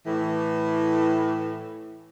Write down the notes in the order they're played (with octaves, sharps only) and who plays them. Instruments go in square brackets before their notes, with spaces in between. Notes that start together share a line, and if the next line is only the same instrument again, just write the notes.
[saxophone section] A2 E3